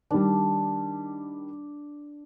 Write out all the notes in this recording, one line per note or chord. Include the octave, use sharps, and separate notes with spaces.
D#3 G3 D4